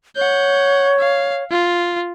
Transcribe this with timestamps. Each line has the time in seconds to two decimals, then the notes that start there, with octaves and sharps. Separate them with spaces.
0.16 C#5 F#5 G6
0.99 F5
1.50 F4